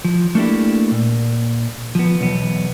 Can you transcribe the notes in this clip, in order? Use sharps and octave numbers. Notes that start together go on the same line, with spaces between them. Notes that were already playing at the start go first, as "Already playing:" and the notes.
F3
A3 A#3 D4 E4 G4
A#2
F3 B3
B1 E2 B3